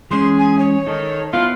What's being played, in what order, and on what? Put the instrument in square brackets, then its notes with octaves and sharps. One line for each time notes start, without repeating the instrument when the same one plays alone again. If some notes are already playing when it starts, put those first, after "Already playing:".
[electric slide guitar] E3 G#3 C#4 [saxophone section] G#4 [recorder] C6
[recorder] G#5
C#5
[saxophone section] D#3 [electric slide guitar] D#4 A4
[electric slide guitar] B3 E4 B4 [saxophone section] F4